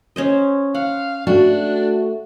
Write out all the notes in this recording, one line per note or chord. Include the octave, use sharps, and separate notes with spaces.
C#4 C5 D#5
F5 F#5
A3 D4 F#4